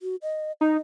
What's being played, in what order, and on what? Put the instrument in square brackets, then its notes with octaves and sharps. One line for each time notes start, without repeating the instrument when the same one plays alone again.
[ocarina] F#4
D#5
[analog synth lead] D#4 [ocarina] D#5